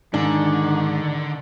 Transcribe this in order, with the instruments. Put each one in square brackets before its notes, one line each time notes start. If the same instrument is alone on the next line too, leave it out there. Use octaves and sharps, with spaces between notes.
[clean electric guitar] G#2 [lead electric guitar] D3 [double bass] D#3 [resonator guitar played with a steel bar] D4